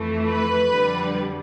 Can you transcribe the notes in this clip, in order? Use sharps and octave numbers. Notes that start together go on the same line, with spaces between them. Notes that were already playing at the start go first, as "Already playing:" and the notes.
Already playing: F2 E3 A3
B4
F2 D3 G3